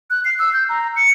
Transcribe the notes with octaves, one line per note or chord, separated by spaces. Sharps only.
F#6
C7
E6
G6
A#5
C#7